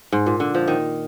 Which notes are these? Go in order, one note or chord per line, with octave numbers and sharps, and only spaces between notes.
G#2
A#2
D3
F3
D#3